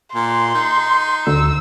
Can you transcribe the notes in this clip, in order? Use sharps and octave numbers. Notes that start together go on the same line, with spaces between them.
A#2 C6
D#4
D2 E6